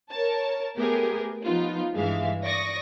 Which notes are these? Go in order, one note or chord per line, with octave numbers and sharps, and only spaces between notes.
A#4 C#5 A5
A3 B3 G4 G#4 A#4
F3 B3 D#4 F4
G2 E3 G#3 E5 F5
D5 C#6 D#6 A#6